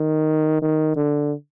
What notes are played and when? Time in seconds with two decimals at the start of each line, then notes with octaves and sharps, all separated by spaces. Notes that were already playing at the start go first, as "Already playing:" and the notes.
Already playing: D#3
0.62 D#3
0.96 D3